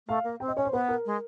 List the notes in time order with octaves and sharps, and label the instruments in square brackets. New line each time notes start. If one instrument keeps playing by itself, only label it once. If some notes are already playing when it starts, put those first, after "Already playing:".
[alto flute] A3 [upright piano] F5
[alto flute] A#3
[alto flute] C4 [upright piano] G5
[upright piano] D#5
[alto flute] C#4 [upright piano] C#5
[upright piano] C5
[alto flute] B3 [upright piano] B4
[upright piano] A#4
[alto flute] G#3